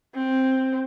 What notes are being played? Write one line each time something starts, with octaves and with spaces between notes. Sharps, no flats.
C4